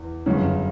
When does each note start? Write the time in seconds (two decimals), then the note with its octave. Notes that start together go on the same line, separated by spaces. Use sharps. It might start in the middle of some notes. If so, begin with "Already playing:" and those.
Already playing: E2
0.26 G1 F#2 C#3